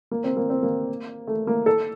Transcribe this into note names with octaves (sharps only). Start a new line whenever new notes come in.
A#3
C4
A#3
C4
A#3
A3
A#3
A4